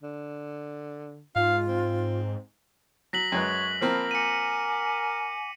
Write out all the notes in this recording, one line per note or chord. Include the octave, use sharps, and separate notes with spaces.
D3
G#2 F4 F5
C4
F#3 A#6 B6 F#7
F#2 G#3 B4 C#5 F#6
F3 A#3 C4 A#4 A5 B5 F6
F#5 G#5 D6 C#7 D#7